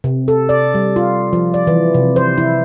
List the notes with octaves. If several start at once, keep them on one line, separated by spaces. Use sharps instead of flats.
C3
A4
D5
G3
F4
F3
D5
E3
C3
C5
E4